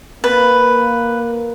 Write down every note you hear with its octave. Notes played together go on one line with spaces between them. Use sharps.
A#3 B4